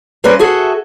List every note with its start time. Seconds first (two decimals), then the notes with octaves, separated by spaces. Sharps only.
0.24 G3 A#3 C4 C#4 B4 D5
0.39 F#4 G#4 A4 E5 F#5